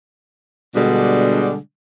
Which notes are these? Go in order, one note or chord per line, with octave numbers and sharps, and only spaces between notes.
B2 D3 G3 G#3 D4